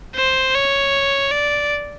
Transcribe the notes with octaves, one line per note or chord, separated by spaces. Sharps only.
C5
C#5
D5